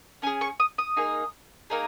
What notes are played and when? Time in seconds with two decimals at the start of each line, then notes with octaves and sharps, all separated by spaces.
0.22 C#4 G#5
0.27 G#4
0.41 C#6
0.60 D#6
0.78 D#6
0.97 A#3 D#4 G#4
1.70 A#3 D#4 G#4